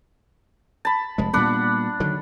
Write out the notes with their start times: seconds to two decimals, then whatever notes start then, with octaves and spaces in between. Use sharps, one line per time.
0.85 A5 B5
1.18 F1 G#3
1.33 A#2 G3 B3 D4 F#5 B5
2.00 D3 D#3 F#3